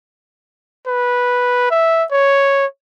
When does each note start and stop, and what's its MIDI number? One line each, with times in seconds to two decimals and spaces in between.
0.87 1.66 71
1.71 2.04 76
2.12 2.66 73